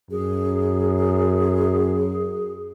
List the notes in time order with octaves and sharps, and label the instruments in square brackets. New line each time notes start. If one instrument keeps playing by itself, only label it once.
[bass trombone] F#2 [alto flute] G#4